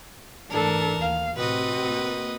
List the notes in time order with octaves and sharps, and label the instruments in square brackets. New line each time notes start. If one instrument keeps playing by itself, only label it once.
[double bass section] G#2 E3 A3 [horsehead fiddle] D4 A4 [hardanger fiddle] A#4 A5
[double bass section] D#2 [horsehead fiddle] F5
[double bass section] A2 C3 [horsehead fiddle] C4 F#4 [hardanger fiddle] B4 D#5
[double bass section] A#3